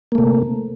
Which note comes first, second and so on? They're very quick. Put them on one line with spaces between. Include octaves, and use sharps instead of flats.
A#3 A3 C3